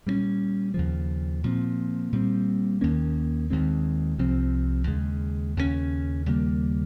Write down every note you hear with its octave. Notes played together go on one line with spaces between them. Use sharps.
A#2 G3 A#3 C#4
D#2 C#3 F3
A#2 F3 C4
A#2 G3 C4
D#2 D#3 A#3 C#4
D#2 D#3 G#3 C4
C2 C3 F3 C4
D#2 C#3 G#3
D#2 C#3 G3 C#4
D#2 C#3 G3 A#3